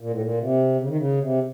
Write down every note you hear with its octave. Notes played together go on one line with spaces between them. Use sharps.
A#2
A2
A#2
C3
C#3
D#3
C#3
C3